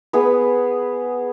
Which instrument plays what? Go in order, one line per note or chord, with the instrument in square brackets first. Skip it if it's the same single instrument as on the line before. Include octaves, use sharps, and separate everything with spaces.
[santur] B3 G#4 B4